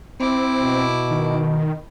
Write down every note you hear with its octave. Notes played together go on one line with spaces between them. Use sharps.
C4 E4 D6
B2
D#3